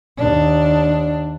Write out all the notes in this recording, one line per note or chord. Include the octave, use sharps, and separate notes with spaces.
D#2 D4